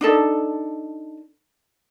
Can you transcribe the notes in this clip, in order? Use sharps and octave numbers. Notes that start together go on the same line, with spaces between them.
D4 D#4 A4